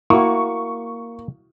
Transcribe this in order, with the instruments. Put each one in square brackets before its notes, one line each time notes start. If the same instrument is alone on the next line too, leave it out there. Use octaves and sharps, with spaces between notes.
[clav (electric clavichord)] A#3 [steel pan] E4 F#4 [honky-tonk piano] C#6